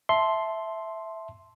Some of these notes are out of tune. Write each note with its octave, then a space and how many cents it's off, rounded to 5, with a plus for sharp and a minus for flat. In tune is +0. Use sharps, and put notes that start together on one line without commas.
E5 +0 A5 -5 C6 +0